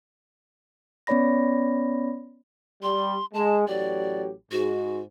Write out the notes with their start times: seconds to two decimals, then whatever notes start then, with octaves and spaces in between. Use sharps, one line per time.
1.07 B3 C#4 C#5 D5 B5 A#6
2.83 G3 C6
3.34 G#3 A5
3.68 A1 F#3 G4 D5
4.52 G#2 F#4